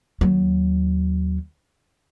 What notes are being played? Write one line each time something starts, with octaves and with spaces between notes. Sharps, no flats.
D#2 F#3